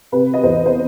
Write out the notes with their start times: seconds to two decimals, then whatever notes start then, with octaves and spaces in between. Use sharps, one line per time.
0.12 C3 B4
0.34 D#5
0.43 E2 C5
0.66 C5